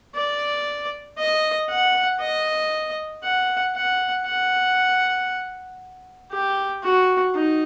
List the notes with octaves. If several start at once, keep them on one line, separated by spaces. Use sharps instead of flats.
D5
D#5
F#5
D#5
F#5
F#5
F#5
G4
F#4
D#4